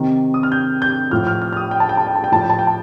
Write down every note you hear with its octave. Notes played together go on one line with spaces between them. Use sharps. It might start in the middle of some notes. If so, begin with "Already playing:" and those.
Already playing: C3 D#3
D#6
F6
G6
G6
A2 F3 F6
F6
F6
F6
D#6
G5
A5
G5
A5
G5
A5
G5
A2 F3 A5
G5
A5
G5
A5